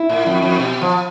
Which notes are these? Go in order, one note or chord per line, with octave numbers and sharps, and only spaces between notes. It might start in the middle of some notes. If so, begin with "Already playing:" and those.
Already playing: E4
A2
F2
F2
B2
F3